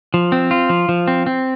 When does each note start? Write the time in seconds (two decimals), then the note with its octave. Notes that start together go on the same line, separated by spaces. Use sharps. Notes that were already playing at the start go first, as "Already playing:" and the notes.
0.14 F3
0.32 C4
0.51 F4
0.69 F3
0.89 F3
1.08 C4
1.26 C4